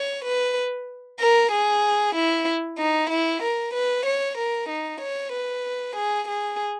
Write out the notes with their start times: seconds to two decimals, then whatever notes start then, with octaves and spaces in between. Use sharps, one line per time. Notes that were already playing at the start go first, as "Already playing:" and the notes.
Already playing: C#5
0.25 B4
1.20 A#4
1.52 G#4
2.16 E4
2.79 D#4
3.10 E4
3.43 A#4
3.74 B4
4.06 C#5
4.38 A#4
4.69 D#4
5.01 C#5
5.33 B4
5.96 G#4
6.28 G#4